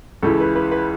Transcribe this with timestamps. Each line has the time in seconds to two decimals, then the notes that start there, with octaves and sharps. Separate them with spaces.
0.22 C#2 C#3 E3 A4
0.40 B4
0.55 B4
0.72 B4